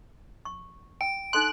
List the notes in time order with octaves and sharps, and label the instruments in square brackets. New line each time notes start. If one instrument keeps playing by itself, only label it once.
[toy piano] C#6
[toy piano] G5 [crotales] D7
[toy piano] D#4 A4 C6 [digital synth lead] F#6